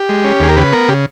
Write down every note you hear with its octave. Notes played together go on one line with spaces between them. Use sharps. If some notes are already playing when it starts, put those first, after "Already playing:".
Already playing: G4
G#3
C#4
D#2 G#4
A#4
C#3 B4
B3 A#4
C#3 G4